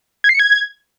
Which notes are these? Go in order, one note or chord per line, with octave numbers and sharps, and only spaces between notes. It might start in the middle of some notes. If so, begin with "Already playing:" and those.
G#6
C7
C#7
G#6